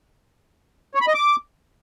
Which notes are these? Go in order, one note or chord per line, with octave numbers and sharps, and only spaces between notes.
C#5
B5
D#5
D6